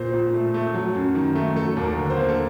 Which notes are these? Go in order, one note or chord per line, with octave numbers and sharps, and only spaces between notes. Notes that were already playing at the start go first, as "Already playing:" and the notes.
Already playing: A#2 C5
A#2
A3
A3
F#3
F#2
D#3
A3
F#3 A4
D#2
A#4
D3
C5
A#3
A4